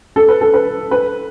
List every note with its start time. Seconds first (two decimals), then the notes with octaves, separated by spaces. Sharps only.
0.16 A4
0.29 B4
0.41 A4
0.54 B4
0.91 B4